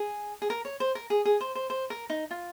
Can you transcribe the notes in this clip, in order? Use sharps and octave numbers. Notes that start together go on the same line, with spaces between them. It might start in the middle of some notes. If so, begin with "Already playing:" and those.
Already playing: G#4
G#4
A#4
C#5
C5
A#4
G#4
G#4
C5
C5
C5
A#4
D#4
F4